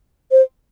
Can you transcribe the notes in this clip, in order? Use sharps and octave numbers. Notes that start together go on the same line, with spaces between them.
C5